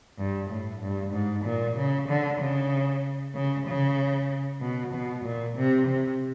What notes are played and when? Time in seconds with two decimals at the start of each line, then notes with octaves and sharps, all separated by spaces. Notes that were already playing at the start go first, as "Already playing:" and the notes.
0.18 G2
0.50 A2
0.81 G2
1.13 G#2
1.45 A#2
1.76 C#3
2.08 D3
2.40 C#3
3.35 C#3
3.67 C#3
4.61 B2
4.93 B2
5.24 A#2
5.56 C3
5.87 C3